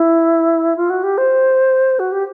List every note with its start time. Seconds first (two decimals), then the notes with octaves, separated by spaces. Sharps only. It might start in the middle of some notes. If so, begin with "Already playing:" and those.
Already playing: E4
0.76 F4
0.90 F#4
1.03 G4
1.18 C5
1.99 F#4
2.12 G4